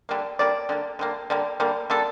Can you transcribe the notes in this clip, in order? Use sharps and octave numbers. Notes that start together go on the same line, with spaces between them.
D3 G3 A#3
D3 G3 A#3 D5
D3 G3 A#3
D3 G3 A#3
D3 G3 A#3
D3 G3 A#3
D3 G3 A#3 A4